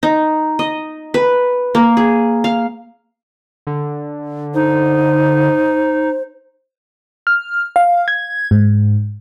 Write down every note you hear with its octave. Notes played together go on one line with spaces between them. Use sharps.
D#4
D#5
B4
A#3
G#4
F5
D3
D#4 C5
F6
F5
G#6
G#2